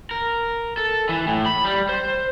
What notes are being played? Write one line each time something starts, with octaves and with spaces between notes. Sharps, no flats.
A#4
A4
E3
A2
B5
G3
C5